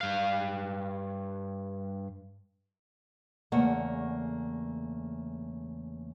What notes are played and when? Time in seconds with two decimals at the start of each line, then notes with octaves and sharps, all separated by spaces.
0.01 G2 F5
3.52 E2 C#3 A3 A#3 D5 F#5